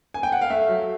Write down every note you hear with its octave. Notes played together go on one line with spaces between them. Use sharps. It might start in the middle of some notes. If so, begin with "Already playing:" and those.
G#5
G5
F#5
F5
A3 E5
F#3